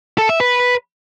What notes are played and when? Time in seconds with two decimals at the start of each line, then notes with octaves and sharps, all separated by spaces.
0.18 A4
0.29 E5
0.40 B4